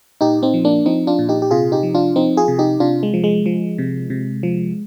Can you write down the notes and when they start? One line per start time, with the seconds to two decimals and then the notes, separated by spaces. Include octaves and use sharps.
0.21 A#2 D#4 G4
0.43 C4 D#4
0.54 F3
0.65 A#3 D4
0.86 F3 C4 D#4
1.07 D4 F4
1.19 A#2
1.29 D#4 G4
1.42 G4
1.51 C3 F4 G#4
1.72 D#4 G4
1.83 F3
1.95 D4 F4
2.16 F3 C4 D#4
2.37 F4 G#4
2.48 C3
2.59 D#4 G4
2.80 C3 D4 F4
3.03 G#3
3.14 F3
3.24 G#3
3.46 F3
3.78 C3
4.10 C3
4.43 F3